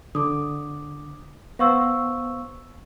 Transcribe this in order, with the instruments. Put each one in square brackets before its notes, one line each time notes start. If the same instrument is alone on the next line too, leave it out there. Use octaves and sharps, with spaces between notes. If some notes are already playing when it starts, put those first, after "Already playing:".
[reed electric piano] D3 [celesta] D6 D#6
[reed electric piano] B3 C5 [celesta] F5 C#6 E6